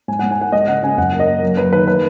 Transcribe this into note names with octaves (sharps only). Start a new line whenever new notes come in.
G#2 G#5
G#2 F#5
G#5
A#3 F#5
G#3 D#5
C#3 F#5
C#3 G#5
F#2 F#5
A#3
D#5
A#3
F#3
F#3 B4
D#3 B4
A#3 B4